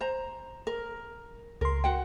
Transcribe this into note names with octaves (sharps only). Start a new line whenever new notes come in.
C5 A#5
A#4
C#2 A#4 C6
F#4 F#5 G5